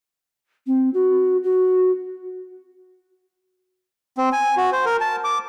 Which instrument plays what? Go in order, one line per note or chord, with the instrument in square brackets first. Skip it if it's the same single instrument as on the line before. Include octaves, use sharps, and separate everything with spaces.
[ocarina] C4
F#4
F#4
[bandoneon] C4
G#5
F#4
C5
A#4
A5
D6